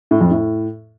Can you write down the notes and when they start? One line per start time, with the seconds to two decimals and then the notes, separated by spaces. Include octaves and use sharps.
0.11 A2
0.21 F2
0.31 A2